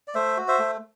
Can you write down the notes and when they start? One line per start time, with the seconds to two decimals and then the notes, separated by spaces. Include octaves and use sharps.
0.08 D5
0.14 A3 C5 E5
0.37 F#4
0.48 C5 E5
0.59 A3